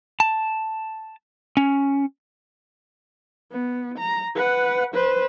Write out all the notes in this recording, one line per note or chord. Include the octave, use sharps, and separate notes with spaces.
A5
C#4
B3
A#5
B4 F#5
B4 C5